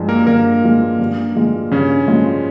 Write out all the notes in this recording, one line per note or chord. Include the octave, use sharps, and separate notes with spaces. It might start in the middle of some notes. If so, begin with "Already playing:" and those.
Already playing: G2 F3 G#3
A#3 A#4
G2 A#3 A#4
F3 G#3
G2
F3 G#3
G2 C#3 C#4
F3 G#3